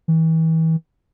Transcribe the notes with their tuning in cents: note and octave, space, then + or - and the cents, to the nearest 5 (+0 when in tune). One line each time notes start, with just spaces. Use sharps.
E3 -35